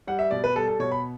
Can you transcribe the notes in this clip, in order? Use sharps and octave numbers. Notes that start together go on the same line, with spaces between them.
G3 F#5
E5
B2 D5
B4
G3 A4
A4
B2 C#5
B5